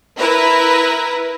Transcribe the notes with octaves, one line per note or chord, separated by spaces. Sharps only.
E4 A#4 B4